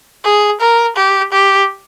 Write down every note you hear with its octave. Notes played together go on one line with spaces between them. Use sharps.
G#4
A#4
G4
G4